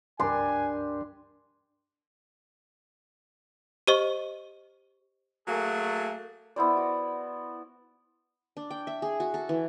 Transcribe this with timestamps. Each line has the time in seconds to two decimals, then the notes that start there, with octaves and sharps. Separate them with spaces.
0.20 C#2 G2 D4 G4 A#4 G#5 C6
3.87 G4 C5 D#5 C#6
5.48 F#3 A3 A#3 G#4
6.56 B3 E4 C5 D5
6.77 F#4
8.57 D4
8.71 G5
8.87 E5
9.02 G#4
9.20 F#4
9.34 A4
9.49 E3